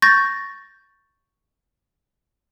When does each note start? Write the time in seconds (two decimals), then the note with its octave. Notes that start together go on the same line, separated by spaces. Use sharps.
0.02 C#6 G6 A6 A#6